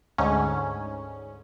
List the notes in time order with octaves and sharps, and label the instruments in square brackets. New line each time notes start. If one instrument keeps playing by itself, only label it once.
[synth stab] D2 G#2 C#4